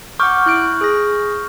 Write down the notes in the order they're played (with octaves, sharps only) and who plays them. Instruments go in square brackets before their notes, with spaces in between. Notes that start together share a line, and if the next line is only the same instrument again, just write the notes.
[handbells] F#5 D6 [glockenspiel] C#6 F6 G6
[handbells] E4 F#6 D7
G#4 A#6